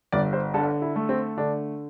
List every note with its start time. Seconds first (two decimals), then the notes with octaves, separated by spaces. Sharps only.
0.12 G1 D5
0.33 C5
0.54 D3 A4
0.82 E4
0.96 A3
1.09 C4
1.37 D3 D4